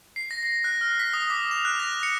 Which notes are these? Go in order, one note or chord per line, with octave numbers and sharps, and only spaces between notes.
C7
A#6
A#6
F#6
F6
B6
D#6
D6
F7
F#6
A#6
C#7